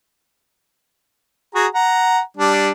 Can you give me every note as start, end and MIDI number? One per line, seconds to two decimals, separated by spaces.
1.55 1.67 66
1.55 1.67 68
1.55 1.67 82
1.75 2.20 78
1.75 2.20 82
2.37 2.71 55
2.37 2.71 62